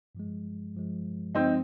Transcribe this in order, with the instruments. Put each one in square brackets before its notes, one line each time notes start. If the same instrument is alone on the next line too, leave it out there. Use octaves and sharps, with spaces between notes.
[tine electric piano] G2 F3 G#3
G2 F3 G#3
[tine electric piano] G2 F3 G#3 [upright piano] C4 D#4